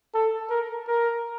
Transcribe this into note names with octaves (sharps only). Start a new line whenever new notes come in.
A4
A#4
A#4